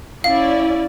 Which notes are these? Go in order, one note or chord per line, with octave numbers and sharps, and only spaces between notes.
C#4 E4 D5 F5